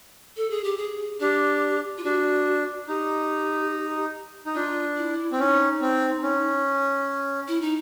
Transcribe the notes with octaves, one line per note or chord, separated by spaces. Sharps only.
A4
G#4
G4
G#4
D4 G4
F4
D4 F#4
D#4 G4
D#4
D4 F4
E4
C4
C#4 D#4
C4
C#4
E4
D#4